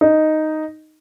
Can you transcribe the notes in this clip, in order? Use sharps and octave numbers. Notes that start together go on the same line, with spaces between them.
D#4